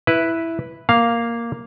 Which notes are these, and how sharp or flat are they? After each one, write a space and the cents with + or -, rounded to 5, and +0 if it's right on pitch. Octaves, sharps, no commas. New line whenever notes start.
E4 +0 B4 +0
A#3 +0 F5 +0